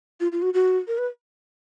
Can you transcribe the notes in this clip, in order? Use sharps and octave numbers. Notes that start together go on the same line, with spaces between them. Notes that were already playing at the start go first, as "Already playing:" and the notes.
F4
F4
F#4
F#4
A#4
B4